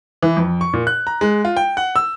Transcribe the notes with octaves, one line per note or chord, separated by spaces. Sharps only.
E3
F2
C#6
A#2
F#6
A#5
G#3
F4
G5
F#5
E6